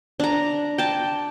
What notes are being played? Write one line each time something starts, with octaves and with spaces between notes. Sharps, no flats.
D4 A#5
G5 A5